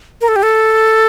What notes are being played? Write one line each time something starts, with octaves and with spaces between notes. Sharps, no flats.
A#4
A4
G4
A4